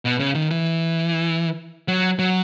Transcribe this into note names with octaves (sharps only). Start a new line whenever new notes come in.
B2
C#3
D#3
E3
F#3
F#3